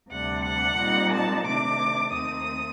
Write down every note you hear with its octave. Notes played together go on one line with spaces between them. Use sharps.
D2 C3 G3 D4 F#5
F#5
A#2 G3 C4 D#4
A5
C3 D#3 A3 D4 D6
D#2 D#3 A3 C4 D#6